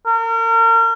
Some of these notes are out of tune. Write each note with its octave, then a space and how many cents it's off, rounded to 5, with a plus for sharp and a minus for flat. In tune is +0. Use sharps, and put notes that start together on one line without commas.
A#4 -35